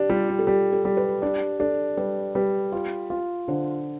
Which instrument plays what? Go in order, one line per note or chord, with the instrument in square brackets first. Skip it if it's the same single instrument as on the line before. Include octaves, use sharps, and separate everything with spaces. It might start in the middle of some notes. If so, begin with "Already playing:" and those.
Already playing: [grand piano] D4 [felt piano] G4
[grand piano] G3 [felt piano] F4
[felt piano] G4
A4
[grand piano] G3 [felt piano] G4
[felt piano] A4
[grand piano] G3
[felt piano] B4
[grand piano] D4 [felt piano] G4
[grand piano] D4 [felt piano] A4
[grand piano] G3 [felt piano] B4
[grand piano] G3 [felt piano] B4
[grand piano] F4
F4
[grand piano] D3 [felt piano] C5